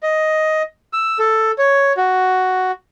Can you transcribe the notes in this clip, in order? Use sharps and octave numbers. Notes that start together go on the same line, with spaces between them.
D#5
E6
A4
C#5
F#4